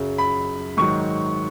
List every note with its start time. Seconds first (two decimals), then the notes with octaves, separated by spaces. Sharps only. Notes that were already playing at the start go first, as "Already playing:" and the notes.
Already playing: F#2 C#3 F#3
0.18 B5
0.77 G#2 D#3 F#3 C#6